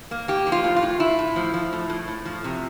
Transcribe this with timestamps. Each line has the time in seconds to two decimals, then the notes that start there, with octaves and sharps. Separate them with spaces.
0.11 A#3
0.28 A#3 G4
0.47 F3
0.52 F4
0.64 A2
0.76 F4
0.83 A2
1.00 A2 E4
1.19 A2
1.36 F3
1.54 F3
1.73 A2
1.89 A2
2.08 A2
2.25 F3
2.44 C3